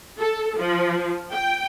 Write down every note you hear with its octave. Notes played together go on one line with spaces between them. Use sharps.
A4
F3
G5